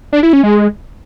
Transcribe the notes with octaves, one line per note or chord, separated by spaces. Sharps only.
D4
E4
C#4
G#3